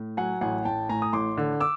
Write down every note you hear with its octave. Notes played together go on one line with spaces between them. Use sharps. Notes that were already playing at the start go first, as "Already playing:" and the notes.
Already playing: A2
F#3 F#5 G#5
A1 F#5 G#5
A1 G5 A5
A2 G#5 A#5
D#6
A1 C6 D6
D3
D6 E6